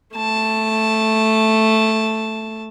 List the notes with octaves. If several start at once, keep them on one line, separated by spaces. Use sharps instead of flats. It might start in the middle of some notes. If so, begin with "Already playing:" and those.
A3 A5